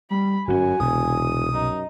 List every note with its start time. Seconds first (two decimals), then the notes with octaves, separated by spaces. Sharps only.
0.10 G3 B5
0.48 G1 F#2 C3 C#4 F#4 G#5
0.80 E1 C2 B2 D#6
1.53 F#2 D#4